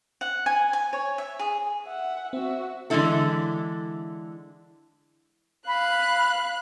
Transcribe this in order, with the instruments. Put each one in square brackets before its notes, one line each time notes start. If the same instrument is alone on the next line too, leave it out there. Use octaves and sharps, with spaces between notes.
[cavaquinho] F#5
G#5
G#5
C#5
E5
G#4
[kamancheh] E5 F#5
[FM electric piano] C4 [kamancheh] F#4 E5
[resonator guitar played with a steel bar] D3 E3 G#3 A#3 E4 A4
[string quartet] F5 F#6 [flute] B5